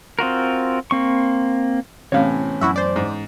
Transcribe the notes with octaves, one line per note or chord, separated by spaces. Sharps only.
C4 F4 F#4 A#4
A#3 C4 C#6
A2 C3 E3 B3 C#4 C#5 F5
F#2 E4 F#4 E5
C5 D5
G#2